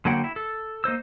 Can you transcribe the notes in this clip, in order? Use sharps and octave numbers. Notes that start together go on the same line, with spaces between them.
D3 F#3 A#3 F#5 G5
E4
A4
A#3 D#4 C5 E6